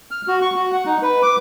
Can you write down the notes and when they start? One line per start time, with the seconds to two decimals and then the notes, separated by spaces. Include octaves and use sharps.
0.11 F6
0.28 F#4
0.42 C#6
0.56 F#4
0.72 F#5
0.86 D#4
1.02 B4
1.22 D6